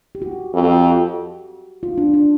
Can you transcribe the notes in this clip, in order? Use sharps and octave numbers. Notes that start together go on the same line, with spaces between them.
G4
F#4
F2
F4
D4
D4